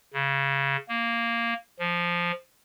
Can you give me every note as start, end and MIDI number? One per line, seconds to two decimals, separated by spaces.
0.14 0.77 49
0.89 1.54 58
1.79 2.31 53